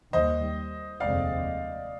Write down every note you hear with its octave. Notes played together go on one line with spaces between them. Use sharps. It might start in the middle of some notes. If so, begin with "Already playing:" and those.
D#2 D#3 G3 C5 D#5
F1 D#2 D3 G#3 C4 D5 F5